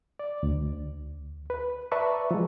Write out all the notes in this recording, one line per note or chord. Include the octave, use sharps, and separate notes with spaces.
D5
D2
B4
B4 D5 E5 A5 A#5 C#6
F3 G#3